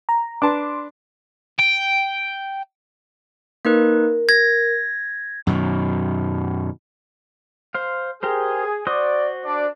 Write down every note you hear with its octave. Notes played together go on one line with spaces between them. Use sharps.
A#5
D4 B4 A5 C6 D6
G5
A#3 D#4 A#4 B4
G#6 A#6
F#2 B2 D#3
C5 F5
G4 G#4 A#4 C5
F#4 C5 D5 D#6
D4 D5